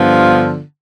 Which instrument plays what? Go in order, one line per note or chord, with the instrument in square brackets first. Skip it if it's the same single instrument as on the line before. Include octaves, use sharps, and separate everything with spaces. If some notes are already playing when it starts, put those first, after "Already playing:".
Already playing: [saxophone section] G2 D3 F3 B3 F4